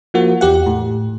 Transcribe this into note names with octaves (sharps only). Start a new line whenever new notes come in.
F3 A#3 F#4
E2 G4 F#5
A2